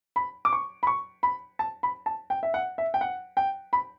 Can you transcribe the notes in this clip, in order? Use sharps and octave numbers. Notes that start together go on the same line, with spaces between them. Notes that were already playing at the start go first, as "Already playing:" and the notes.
B5
D6
C#6
B5
C#6
B5
A5
B5
A5
G5
E5
F#5
E5
G5
F#5
G5
B5